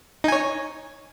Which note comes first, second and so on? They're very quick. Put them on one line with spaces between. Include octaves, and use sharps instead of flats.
D#4 G#5 C#5